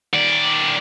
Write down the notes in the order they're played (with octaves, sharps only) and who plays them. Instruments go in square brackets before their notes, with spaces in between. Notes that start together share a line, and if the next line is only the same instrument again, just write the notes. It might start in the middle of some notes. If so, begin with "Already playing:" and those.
[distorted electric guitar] D#3 D5